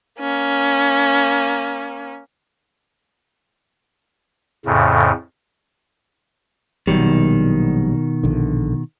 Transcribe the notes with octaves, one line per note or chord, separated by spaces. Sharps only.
A#3 C#4
F2 A2 C#3
A#1 B2 D#3 F#3 G3
A#1 D3